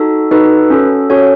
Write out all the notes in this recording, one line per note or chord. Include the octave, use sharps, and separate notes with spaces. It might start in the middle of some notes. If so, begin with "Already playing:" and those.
Already playing: D#4 F#4 A4
D#4 F#4 A4 B4
C#4 F#4 A4
C#4 F#4 A4 C#5